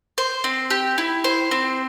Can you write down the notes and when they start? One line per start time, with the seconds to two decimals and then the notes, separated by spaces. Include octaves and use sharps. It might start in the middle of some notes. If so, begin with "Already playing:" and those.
0.18 C5
0.44 C4
0.70 G4
0.98 E4
1.24 C5
1.51 C4